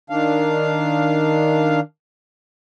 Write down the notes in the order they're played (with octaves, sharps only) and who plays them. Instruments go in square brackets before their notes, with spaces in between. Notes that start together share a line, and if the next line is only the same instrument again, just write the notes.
[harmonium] D#3 D4 F5